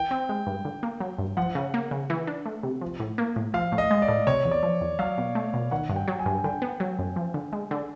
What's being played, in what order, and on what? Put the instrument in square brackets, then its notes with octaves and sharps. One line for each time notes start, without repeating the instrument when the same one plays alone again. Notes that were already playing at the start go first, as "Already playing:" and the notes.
Already playing: [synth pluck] E3 [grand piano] G5
[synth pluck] C4
G#3
G2
D3
A#3
F#3
G2
[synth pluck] F3 [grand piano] F#5
[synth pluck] C#3
A#3
C#3
E3
D4
A3
C3
F3
A2
A#3
A2
[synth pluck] F3 [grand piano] F5
[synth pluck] A2
[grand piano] D#5
[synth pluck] G#3
[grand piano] D5
[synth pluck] A2
[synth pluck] C3 [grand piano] C#5
[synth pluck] E2
[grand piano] D5
[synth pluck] F3
E2
[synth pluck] F#3 [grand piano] F5
[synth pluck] B2
A3
B2
[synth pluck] D#3 [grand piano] F#5
[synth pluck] G2
[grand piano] G5
[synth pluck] F#3
[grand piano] G#5
[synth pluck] G2
[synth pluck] D3 [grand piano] G5
[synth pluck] B3
F#3
F#2
F3
D3
G#3
D3